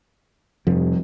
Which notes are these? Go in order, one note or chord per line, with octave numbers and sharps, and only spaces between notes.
F1 F3 G3